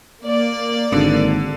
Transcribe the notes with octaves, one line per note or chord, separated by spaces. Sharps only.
A#3 D5
G#1 D3